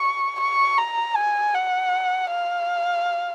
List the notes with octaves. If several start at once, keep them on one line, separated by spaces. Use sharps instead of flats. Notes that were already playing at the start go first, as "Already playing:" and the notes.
Already playing: C#6
C#6
A#5
G#5
F#5
F5